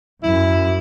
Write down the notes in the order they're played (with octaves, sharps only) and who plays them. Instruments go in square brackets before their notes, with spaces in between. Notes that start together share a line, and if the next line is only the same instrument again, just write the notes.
[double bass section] F#2 [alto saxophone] E4